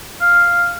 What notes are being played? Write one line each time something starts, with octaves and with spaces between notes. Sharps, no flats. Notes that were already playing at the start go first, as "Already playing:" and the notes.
F5